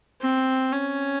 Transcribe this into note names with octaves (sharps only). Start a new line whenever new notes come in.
C4
C#4